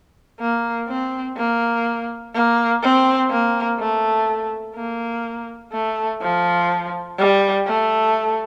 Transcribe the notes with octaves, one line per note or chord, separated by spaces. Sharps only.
A#3
C4
A#3
A#3
C4
A#3
A3
A#3
A3
F3
G3
A3